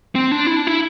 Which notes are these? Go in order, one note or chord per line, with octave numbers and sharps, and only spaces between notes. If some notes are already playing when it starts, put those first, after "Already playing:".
C4
D4
E4
D4
E4